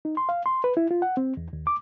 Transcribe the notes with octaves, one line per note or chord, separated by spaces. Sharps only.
D#4
C6
F5
C6
B4
E4
F4
F#5
C4
E2
D#2
D6